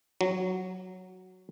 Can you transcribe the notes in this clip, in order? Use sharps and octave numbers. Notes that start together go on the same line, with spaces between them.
F#3